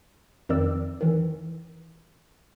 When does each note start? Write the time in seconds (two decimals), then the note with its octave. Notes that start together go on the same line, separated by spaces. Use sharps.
0.49 F2 D#3 D5 E6
1.01 D#3 E3